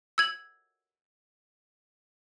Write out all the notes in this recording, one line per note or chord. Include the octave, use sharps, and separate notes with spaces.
E6 G#6 F#7